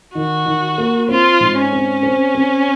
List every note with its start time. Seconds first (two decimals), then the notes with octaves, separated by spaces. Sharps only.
0.15 D#3 F#4
0.46 D#3
0.78 A#3
1.08 C4 F4
1.40 G#2
1.57 C#4
1.73 C4
2.03 C4
2.35 C4